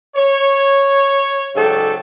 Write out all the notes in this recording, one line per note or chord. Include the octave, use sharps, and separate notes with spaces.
C#5
G#2 C#3 F#3 A4 D5 G5